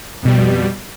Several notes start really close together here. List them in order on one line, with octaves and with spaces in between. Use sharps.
F2 B2 G3